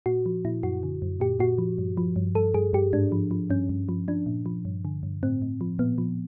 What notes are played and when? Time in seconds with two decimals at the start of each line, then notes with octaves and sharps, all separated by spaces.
0.06 A#2 F#4
0.26 F3
0.45 A#2 E4
0.63 F#2 F#4
0.83 D3
1.02 F#2
1.20 A#2 G4
1.39 A#2 F#4
1.58 F3
1.78 G2
1.97 F3
2.16 G2
2.35 G2 A4
2.54 G2 G#4
2.73 G2 G4
2.93 G#2 D4
3.12 F3
3.31 F3
3.50 G2 C#4
3.69 G2
3.89 F3
4.08 F3 D4
4.26 A#2
4.46 F3
4.65 G2
4.85 D3
5.03 G2
5.23 A2 C4
5.42 A2
5.61 F3
5.79 A#2 B3
5.98 F3